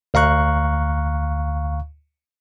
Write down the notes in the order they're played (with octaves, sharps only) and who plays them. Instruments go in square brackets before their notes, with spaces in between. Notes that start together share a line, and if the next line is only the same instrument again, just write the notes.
[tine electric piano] D2 F5 A#5 C#6 F#6